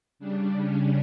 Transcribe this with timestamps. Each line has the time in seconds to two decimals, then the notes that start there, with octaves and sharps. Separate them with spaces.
0.19 C#3 G3 D4
0.57 C#4